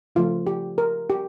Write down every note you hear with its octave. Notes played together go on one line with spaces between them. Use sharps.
C#3 F3 A3 F4
G4
A#4
G4